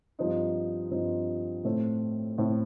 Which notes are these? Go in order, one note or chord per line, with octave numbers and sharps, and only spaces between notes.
G2 F3 C4 D#4
G2 F3 C4 D#4
A2 A3 C4
A2 A3 C4